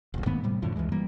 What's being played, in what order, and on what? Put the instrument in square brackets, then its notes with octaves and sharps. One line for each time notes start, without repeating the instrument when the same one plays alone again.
[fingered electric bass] E1 C#2
G#2 D#3 A#3 B3
A2 C3 G3
F#2 A2 D3 F3
C#2 F#2 E3 G#3
E3 G3 A#3